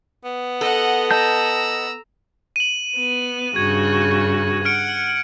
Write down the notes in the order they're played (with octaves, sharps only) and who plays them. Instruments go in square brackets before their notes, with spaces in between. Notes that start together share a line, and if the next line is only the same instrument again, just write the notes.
[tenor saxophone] B3
[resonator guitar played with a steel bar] A4 [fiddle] D#5 F#5
[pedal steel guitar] D#5 A5 G6 [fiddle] A#5 E6
[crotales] D#7 F#7
[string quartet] B3
[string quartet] G2 C#3 F#4 [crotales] G#6
[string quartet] F#5 [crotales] F6 C#7 D7